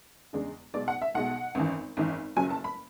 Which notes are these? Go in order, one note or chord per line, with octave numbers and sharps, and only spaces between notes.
E2 C#3 G#3 D4
B1 B2 G#3 D5
F#5
E5
B1 B2 G#3 F#5
G#1 F#2 E3
G#1 F#2 E3
F#1 F#2 C#3 F#3 G#5
A5
B5